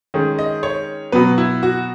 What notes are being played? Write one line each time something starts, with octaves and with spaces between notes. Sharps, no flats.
D#3 G#3 C#4
D#5
C#5
B2 F#3 B3 B4
E4
F#4